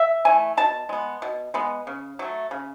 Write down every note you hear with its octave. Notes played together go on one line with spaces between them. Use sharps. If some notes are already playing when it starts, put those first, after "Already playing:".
Already playing: E5
E3 A3 G#5
B2 A5
G#3 B3
B2
G#3 B3
C#3
F#3 A3
C#3